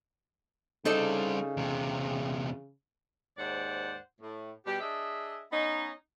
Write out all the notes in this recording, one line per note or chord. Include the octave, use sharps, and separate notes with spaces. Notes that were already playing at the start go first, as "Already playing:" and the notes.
C#3 G3 C4 D#4 A4 D5
E2 C3
D#2 G#2 C5 D5 F#5
A2
B2 G3 G4
D4 G#4 D#5 E5
B3 C#4 D#4